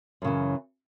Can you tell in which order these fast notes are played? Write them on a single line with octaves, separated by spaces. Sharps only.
F#2 C#3 E3